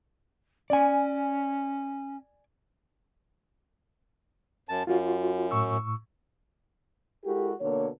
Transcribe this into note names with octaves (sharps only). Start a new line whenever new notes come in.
C#4 D5 G#5
F#2 A5
F#2 F4 F#4
A2 C#6 E6
G#3 E4 F#4 G4 A4 A#4
B2 D3 A#3 C#5